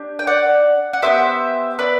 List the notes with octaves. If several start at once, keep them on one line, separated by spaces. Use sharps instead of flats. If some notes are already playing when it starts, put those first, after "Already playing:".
Already playing: D4 G4
G5
D5 F#5
F#5
B3 E4 G4 C5 E5
B4 D5